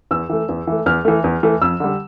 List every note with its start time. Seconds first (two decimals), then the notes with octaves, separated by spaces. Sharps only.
0.11 E2 E6
0.29 E3 A3
0.49 E2
0.67 E3 A3
0.86 E2 F6
1.05 E3 A3
1.24 E2
1.43 E3 A3
1.62 F2 E6
1.80 D3 G3